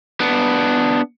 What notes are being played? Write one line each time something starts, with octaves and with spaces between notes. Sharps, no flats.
B3 D4